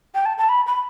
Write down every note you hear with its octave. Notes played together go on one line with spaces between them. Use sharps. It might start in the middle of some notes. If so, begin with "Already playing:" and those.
G5
A5
A5
B5
B5